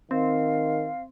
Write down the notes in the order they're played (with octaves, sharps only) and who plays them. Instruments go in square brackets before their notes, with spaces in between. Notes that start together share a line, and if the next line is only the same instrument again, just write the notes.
[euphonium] D#3 [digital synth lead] C4 [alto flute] F5